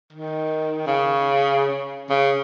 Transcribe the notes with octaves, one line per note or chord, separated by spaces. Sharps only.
D#3
C#3
C#3